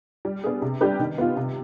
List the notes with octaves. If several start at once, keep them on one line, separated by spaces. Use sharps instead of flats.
G3
B3 D4 G#4
C3
G3 D4 G4 B4
D#3
B3 F4
C3